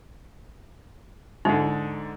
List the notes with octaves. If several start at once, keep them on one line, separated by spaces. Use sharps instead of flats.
G#2 D3 D#4